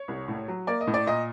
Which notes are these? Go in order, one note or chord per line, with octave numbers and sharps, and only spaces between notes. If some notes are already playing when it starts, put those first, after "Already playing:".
Already playing: C#5
C2
A2
F#3
A#3 D5
D#5
A2
D5
A#2 D#5